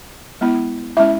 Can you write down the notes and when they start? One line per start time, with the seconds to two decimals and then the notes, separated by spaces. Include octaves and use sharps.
0.41 G#3 B3 E4
0.97 G#3 C#4 E4 E5